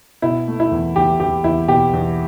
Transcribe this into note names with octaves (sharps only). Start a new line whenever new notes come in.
B2 E4
A3
E4
E2
E2 G4
E2 G4
E2 E4
B2 G4
E2